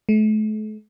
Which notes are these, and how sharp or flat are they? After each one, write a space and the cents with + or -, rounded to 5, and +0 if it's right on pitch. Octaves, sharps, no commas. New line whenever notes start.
A3 -40